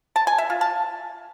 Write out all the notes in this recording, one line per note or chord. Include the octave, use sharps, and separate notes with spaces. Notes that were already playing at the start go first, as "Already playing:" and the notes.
A5
G#5
E5
F4
A5